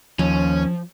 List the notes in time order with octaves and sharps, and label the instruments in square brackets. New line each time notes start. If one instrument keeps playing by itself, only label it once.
[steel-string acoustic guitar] D#2 [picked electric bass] F3 [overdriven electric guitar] C#4